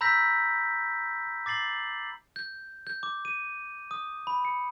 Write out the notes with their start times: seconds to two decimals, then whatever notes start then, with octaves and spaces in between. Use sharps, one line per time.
0.01 A#5 B5 E6 G6 A#6 B6
1.46 D6 A6 C7 F#7
2.36 G6
2.87 G6
3.03 D6
3.25 D#7
3.91 D#6
4.27 B5
4.45 C#7